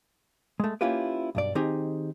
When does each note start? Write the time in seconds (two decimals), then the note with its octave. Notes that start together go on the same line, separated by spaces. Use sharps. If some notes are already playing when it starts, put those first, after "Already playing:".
0.60 G#3 A3
0.81 A#3 C#4 E4 F4 G4 B4
1.35 B1 G2 D5
1.55 D#3 C4 D#4 G4 G#4